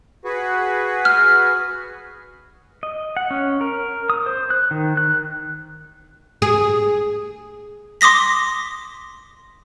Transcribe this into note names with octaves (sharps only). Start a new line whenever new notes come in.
F#4 G#4 B4
F6
D#5
F#5
C#4
A#4
D#6
C5
F#6
D#3
F#6
G#4
C6 D6 D#6 A#6 B6